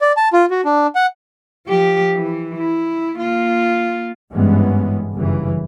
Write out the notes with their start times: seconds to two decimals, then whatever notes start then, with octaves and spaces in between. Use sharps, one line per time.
0.01 D5
0.17 A5
0.33 F4
0.50 F#4
0.65 D4
0.95 F#5
1.67 F3 G4
2.15 E3
2.59 E4
3.16 A#3 F4
4.33 G#1 G2 E3 G#3 B3 C#4
5.15 G1 F#2 C#3 E3